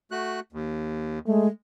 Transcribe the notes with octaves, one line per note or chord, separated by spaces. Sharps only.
A3 F#4 F#6
D#2
G#3 A3